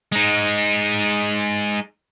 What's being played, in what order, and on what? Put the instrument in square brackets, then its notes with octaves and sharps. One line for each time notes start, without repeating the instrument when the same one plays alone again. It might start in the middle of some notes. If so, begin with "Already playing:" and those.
[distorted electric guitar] G#3 D#4